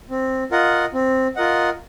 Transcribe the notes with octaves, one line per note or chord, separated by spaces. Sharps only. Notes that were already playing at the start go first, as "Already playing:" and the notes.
C4
F4 A#4 D#5 F#5
C4
F4 A#4 D#5 F#5